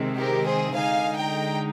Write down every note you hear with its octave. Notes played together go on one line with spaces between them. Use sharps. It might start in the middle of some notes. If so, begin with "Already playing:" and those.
Already playing: C3 D#3 G#3 C4
G4 A#4
G#4 C5
D3 G#3 D#4 F5 G#5
G5 A#5